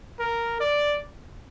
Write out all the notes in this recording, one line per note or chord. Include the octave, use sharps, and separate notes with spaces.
A#4
D5